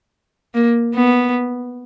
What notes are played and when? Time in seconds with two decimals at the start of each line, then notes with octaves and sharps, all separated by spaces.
0.54 A#3
0.95 B3